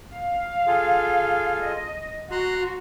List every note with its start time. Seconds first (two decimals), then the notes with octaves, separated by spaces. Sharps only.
0.11 F5
0.67 F4 G#4 A4
1.65 D#5
2.31 F#4 A#5 C6 F#6